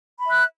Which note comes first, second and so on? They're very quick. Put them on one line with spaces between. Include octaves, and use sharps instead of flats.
B5 E5 F#6